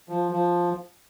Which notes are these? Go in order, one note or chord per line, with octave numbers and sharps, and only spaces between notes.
F3
F3